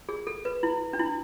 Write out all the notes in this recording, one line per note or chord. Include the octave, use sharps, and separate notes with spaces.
G#4
A4
B4
E4
D4
E4